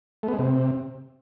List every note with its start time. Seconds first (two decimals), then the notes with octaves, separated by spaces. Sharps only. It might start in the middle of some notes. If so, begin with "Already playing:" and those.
0.23 A3
0.28 B3
0.33 G#3
0.39 C3